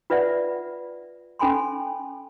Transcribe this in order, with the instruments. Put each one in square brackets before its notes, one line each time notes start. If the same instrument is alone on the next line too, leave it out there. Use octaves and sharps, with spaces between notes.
[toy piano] F4 B4 D5 E5 F#5
C#4 A4 G#5 B5 C6